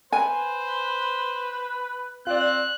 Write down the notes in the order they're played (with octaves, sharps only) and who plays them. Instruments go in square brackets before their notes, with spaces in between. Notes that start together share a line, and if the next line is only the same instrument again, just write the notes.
[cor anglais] B4 [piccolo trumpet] C5 [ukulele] G#5
[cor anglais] C4 [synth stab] F4 D5 [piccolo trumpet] F#6